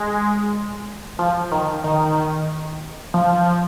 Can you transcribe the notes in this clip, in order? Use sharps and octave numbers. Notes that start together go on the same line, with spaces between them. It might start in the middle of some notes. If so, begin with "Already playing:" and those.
Already playing: G#3
F3
D#3
D#3
F3